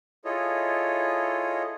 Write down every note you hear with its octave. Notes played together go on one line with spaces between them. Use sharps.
E4 F4 G#4 A4 C#5 D#5